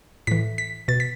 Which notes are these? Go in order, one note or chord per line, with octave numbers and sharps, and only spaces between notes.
A2 E3 B6
B6
B2 A6
B6